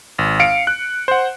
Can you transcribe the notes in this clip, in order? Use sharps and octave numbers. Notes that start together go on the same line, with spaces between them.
G#1
F5 C#7 D7
F#6
C5 F#5